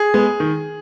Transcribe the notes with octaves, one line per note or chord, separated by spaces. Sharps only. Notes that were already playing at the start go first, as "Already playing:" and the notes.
Already playing: G#4
G#3 B3
D#3